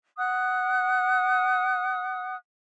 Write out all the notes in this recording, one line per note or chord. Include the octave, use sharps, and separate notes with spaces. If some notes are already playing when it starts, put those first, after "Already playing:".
F#5 D#6 F#6